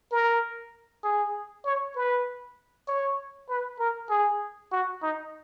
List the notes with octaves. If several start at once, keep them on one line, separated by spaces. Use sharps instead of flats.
A#4
G#4
C#5
B4
C#5
B4
A#4
G#4
F#4
D#4